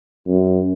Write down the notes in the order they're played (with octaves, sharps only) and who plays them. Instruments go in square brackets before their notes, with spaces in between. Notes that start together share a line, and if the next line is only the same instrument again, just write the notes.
[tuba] F#2